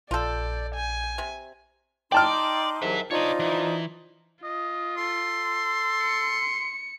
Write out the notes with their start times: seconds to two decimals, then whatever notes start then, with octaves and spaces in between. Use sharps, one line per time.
0.11 A#1 F4 A4 D5 G6
0.75 G#5
1.18 C3
2.12 D#4 D5 G5 A5 C6 D6 F6
2.82 C2 G#2 F#3 B4 E5
3.11 F3 D4 D#4 F4 C#5 D#5
3.40 E3
4.43 F4 D#5
4.97 A4 C6
6.02 C#7